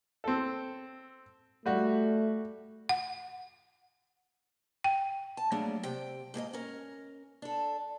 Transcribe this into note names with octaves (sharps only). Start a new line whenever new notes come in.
C4 A4
G3 A3 F#4
F#5
G5
A5
F#3 G3 A3 A#3 D4 G#4
C3 G5
G#2 A#3 G#4 D#5
C#4 A#4
D4 A4